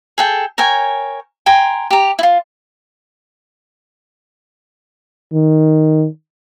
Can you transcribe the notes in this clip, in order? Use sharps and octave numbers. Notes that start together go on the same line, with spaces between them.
G#4 A4 G5
A#4 C#5 G5 G#5
G5 G#5 A#5 C6
G4 A#5
E4 F4
D#3